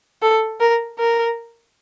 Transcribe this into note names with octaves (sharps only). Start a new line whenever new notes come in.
A4
A#4
A#4